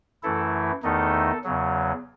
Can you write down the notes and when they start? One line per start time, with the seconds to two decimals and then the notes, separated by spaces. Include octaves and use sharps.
0.23 F#2 E3 A3 E4 A4
0.83 E2 D#3 A3 D#4 A4
1.44 E2 C#3 F#3